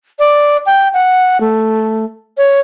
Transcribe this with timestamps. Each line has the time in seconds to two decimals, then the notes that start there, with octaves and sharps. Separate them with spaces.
0.19 D5
0.66 G5
0.94 F#5
1.41 A3
2.38 C#5